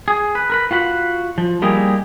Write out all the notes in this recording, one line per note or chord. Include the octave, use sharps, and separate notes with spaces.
G#4
B4
A#4 B4 B5
F4 F#4 F#5 B5
F3
G3 A#3 D#4 E4 G4 G#4